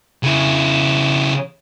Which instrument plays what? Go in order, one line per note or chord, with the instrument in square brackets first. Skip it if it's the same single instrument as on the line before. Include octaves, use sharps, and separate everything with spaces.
[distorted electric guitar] C#3 E4